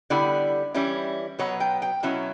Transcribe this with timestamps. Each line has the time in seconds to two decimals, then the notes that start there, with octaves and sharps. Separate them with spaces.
0.10 D3 G3 B3 E4 D5
0.74 E3 G3 C#4 E4
1.39 B2 F#3 B3 C#5
1.60 G5
1.82 G5
2.03 B2 F#3 C#4 E4